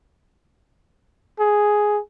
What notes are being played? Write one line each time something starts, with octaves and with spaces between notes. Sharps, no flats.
G#4